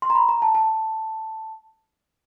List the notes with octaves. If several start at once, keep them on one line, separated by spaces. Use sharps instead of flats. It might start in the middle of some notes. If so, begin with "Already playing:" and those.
C6
A#5
B5
A#5
A5
A5